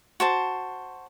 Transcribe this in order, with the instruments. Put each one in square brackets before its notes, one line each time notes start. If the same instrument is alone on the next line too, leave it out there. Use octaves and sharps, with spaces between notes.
[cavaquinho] F#4 C5 A5